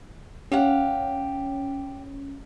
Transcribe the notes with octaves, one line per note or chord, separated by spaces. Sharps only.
C#4 G4 F5 F#5